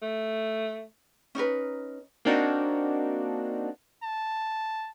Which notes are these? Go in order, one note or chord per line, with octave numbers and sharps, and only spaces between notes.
A3
C#4 D#4 A#4 B4
A#3 C4 D4 D#4 F#4
A5